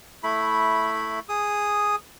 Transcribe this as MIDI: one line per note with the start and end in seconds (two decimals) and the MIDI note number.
0.23 1.20 57
0.23 1.20 64
0.23 1.20 83
1.29 1.96 68
1.29 1.96 87